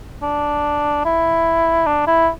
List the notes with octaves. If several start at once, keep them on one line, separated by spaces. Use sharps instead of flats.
D4
E4
D4
E4